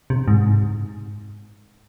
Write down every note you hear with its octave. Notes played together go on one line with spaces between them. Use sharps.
C3
G#2